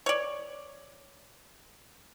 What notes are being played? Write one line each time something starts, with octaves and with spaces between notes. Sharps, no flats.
C#5 D5